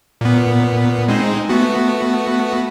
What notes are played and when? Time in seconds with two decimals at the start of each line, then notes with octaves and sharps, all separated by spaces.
0.21 A#2 B3
1.08 G#3 C4 D#4
1.49 A3 B3 F#4